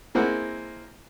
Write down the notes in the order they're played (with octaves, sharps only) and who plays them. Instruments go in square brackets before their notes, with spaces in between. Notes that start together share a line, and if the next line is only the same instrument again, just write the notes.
[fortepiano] G#3 A#3 C4 E4 F#5